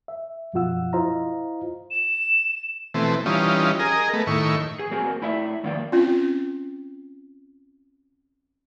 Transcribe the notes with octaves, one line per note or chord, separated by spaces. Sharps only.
E5
F#2 B2 F3 F4 F#5 E6
E4 F4 C5 D#5 F5 A#5
E7
B2 E3 A3 C4
E3 G3 C#4 D#4 F4
G#4 A#4 D#5
A3 B3
A2 D#3 E4 C#6
G#4
A#3 C4 F#4 A#4 G#5
A2 E4 D5 E5
F2 D3 D#3 A#3 D5 G5
C4 C#4 F4